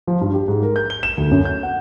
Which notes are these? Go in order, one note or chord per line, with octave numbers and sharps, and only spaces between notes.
F3
G2
G4
G#2
A#4
G6
G7
E7
D2
F#2
G6
F#5